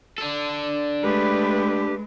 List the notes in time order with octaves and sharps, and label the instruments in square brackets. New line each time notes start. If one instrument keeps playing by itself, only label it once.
[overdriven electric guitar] D4 A4
[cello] G#3 A3 [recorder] G4 [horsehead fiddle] B4